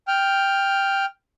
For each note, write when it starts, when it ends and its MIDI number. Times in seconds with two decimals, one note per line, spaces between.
0.08 1.05 79
0.08 1.05 89